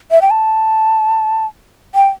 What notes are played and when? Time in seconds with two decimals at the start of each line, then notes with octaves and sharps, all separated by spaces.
0.11 E5
0.22 G5
0.31 A5
1.95 G5